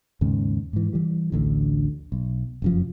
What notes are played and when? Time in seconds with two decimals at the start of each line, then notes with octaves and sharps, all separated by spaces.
0.21 D#2 G#2 C#3
0.73 G#2 E3
0.93 E3 G3
1.32 A1 D2 D3
2.12 B1
2.62 F1 F#2 F3